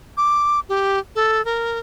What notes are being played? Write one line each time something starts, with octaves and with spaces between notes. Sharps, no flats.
D6
G4
A4
A#4